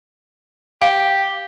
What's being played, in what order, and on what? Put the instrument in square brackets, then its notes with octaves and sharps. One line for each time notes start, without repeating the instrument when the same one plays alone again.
[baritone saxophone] G4 [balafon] F5